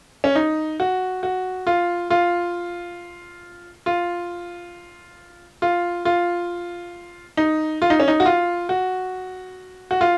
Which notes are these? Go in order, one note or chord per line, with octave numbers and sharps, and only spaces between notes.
C#4
D#4
F#4
F#4
F4
F4
F4
F4
F4
D#4
F4
D#4
C#4
D#4
F#4
F4
F#4
F#4
F4